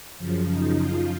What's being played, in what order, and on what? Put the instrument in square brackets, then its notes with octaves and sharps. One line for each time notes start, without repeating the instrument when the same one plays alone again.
[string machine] F#2 C#3 F3
D#4
F#2 F3 F4